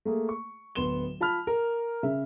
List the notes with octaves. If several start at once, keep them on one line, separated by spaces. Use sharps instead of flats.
A3 A#3 G#4
C#6
D1 B3 C6 E7 G7
F4 A5 B5 F6
A#4
C#3 E5